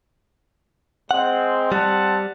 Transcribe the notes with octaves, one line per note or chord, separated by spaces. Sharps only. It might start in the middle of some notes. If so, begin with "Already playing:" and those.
G#3 C4 F#5
G3 C4 F#5 A5